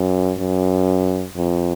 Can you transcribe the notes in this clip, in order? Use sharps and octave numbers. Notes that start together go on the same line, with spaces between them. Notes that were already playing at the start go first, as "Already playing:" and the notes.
Already playing: F#2
F#2
F2